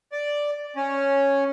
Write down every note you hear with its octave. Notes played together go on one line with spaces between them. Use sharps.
D5
C#4